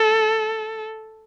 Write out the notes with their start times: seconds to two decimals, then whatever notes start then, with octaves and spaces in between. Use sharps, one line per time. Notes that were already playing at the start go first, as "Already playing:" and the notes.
Already playing: A4